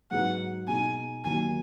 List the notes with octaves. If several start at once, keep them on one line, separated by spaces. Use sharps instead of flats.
G#2 F#3 D#4 G#4 B4 F#5
B2 G#3 D#4 G#5
D#2 D#3 F#3 D#4 G#5